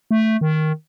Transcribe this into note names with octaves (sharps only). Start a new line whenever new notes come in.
A3
D#3